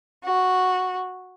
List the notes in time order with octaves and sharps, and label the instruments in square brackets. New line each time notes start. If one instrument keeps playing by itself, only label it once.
[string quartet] F#4